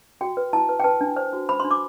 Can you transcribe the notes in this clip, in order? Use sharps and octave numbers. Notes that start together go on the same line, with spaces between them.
F#4 G5
B4
E4 A5
B4
G5
B4 A5
D4
C5
F#4
C5 B5
C6
D4
D6